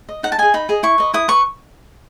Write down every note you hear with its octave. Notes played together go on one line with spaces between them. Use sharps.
D#5
D#4 F#5
A5
G#4 D#5 G#5
D#4 B5
G#4 D#5
E4 C#6
B4 D#5
E4 D#6
B4 C#6